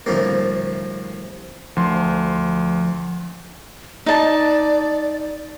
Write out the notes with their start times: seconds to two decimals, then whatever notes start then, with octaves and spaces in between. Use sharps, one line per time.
0.06 D2 A2 C3 F3 G3 A#3
1.76 D2 F3 C6
4.06 D#4 D5 A5